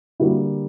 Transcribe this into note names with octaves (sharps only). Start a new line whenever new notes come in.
D3 G3 A#3 E4 F#4